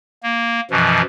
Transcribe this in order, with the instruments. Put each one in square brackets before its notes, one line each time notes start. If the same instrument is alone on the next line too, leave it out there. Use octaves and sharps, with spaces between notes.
[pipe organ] A#3
F#2 B2 E3 F3